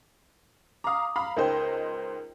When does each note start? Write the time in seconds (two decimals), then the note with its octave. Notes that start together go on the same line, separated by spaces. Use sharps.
0.84 F5 A#5 D6 D#6
1.16 F5 A#5 B5
1.37 C#2 D#4 A#4 C5 G5